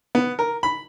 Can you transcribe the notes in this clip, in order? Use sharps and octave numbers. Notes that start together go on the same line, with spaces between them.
B3
A#4
B5